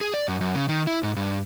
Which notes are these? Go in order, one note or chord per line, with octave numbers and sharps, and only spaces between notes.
G#4
D5
F#2
F#2
C#3
D#3
E4
G#2
G2